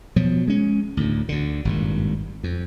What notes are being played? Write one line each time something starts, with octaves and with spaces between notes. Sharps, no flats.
B2 F3 F#3
G#3 C#4
D2 A2
D2 D3
G#1 G2 A#2
F2